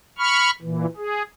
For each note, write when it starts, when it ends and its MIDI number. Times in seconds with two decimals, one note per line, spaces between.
0.18 0.50 83
0.18 0.50 85
0.18 0.50 89
0.62 0.86 46
0.62 0.86 52
0.97 1.22 68